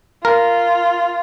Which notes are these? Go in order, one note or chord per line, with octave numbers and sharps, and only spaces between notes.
F4 A#4